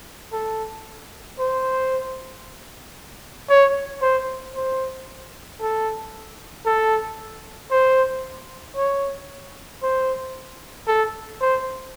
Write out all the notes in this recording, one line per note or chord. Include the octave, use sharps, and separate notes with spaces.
A4
C5
C#5
C5
C5
A4
A4
C5
C#5
C5
A4
C5